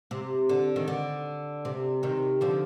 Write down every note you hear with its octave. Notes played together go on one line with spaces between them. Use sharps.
C3
D3
D#3
D3
C3
C3 D#3
D3 F3